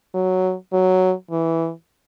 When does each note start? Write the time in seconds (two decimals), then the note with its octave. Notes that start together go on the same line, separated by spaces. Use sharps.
0.14 F#3
0.72 F#3
1.31 E3